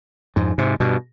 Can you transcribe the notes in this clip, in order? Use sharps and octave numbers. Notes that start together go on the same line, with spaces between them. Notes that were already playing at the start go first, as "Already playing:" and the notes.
F2 G#2
G#2 C3
G2 B2